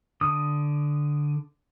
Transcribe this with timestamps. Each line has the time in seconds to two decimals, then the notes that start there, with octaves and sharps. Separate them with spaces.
0.21 D3 D#6